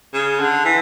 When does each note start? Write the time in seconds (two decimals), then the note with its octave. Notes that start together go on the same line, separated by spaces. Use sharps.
0.14 C#3
0.40 D3
0.65 E3